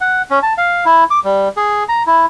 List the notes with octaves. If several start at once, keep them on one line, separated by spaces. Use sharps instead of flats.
F#5
C#4
A5
F5
E4
D6
G3
G#4
A#5
E4